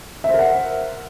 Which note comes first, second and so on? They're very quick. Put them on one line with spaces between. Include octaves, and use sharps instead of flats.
E5 C5 A#4 F#5